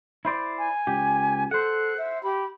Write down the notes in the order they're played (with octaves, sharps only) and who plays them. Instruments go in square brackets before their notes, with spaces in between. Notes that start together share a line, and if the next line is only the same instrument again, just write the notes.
[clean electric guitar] E4 C5 D5
[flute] G#5
[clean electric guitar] C#2 G4
[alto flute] A4 [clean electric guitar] C5 F#5 [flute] F#6
[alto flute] E5
[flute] G4 [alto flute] B5